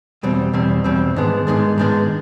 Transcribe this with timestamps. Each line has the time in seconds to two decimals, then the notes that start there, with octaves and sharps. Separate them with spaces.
0.23 E2 B2 G3 C4
0.53 E2 B2 G3 C4
0.84 E2 B2 G3 C4
1.16 G#2 D#3 G#3 B3 D4
1.47 G#2 D#3 G#3 B3 D4
1.78 G#2 D#3 G#3 B3 D4